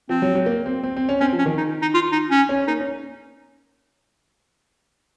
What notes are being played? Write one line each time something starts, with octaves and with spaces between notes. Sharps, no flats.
F3 C4
F#3
F#3
A#3
C4
C4
C4
C#4
C4 C#4
F3
C#4
D#3
D#4
D#4
F4
D#4
C#4
C#4
A#3 D#4
C#4